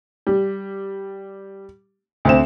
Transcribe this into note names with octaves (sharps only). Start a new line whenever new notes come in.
G3
D2 C4 E7